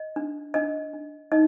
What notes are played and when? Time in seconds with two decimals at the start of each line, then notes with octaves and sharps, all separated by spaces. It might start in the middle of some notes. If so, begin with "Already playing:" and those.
Already playing: D#5
0.16 D4
0.54 D4 D#5
0.94 D4
1.32 D#4 D#5